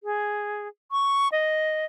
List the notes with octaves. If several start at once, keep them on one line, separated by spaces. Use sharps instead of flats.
G#4
C#6
D#5